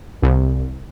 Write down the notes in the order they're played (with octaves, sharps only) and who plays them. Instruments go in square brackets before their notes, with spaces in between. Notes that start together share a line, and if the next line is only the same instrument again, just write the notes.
[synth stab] C2